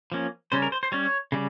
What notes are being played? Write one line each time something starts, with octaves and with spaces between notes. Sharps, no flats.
F3 A#3 C#4
C#3 G3 C#4 C5
A#4
C5
C5
G3 C#4 C#5
C#3 G3